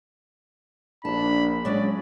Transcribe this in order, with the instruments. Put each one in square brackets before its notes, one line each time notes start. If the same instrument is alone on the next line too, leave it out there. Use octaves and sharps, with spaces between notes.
[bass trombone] A#1 [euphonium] D4 [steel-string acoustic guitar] A5 [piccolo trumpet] B5
[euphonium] F3 [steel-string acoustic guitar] F#3 G#3 C#4 [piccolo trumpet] D5